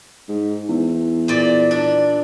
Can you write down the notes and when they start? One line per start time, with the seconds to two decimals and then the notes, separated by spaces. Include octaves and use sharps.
0.29 G#2
0.69 E2
1.28 A#2 D5
1.71 D4